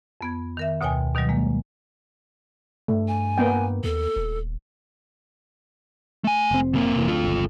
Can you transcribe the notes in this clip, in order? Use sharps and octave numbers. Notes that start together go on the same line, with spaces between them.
F2 B3 G#6
D#3 A#4 E5
D2 B2 C#5 G5 G#5
B2 D#3 F#3 G3
G#3 A#3
G2 A3
G#5
A#3 B3 G5
D#2 A4
D#1
A3 G#5
F1 C4
C3 A#3
F1 E3
D2 F4 A4
G1 C#2